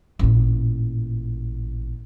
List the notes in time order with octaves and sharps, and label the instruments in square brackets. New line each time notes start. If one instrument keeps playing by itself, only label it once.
[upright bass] A1 A#2